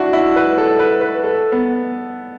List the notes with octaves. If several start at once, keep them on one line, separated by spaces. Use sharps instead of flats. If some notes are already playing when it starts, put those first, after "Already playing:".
Already playing: D4 E4 F#4
E4
B4
A4
B4
B4
A4
B3